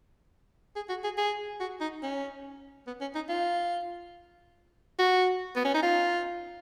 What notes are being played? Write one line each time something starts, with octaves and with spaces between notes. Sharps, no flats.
G#4
F#4
G#4
G#4
F#4
D#4
C#4
B3
C#4
D#4
F4
F#4
B3
C#4
D#4
F4